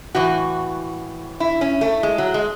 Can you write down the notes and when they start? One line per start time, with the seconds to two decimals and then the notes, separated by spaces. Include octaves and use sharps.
0.15 A2 E3 F#4
1.40 E4
1.61 C#4
1.81 A3
2.03 G#3
2.18 F#3
2.34 G#3